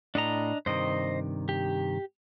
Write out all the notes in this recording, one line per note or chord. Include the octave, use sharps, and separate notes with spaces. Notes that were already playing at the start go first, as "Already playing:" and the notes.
A2 D4 D#5 A#5
G2 C3 D#3 C5 D#5
G4